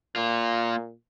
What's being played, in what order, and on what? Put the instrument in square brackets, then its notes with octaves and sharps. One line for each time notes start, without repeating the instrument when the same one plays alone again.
[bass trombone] A#2 [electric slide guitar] A#3 F4